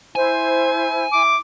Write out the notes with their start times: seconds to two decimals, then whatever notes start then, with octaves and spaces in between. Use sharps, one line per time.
0.16 E4 C5 G#5
1.12 E4 D6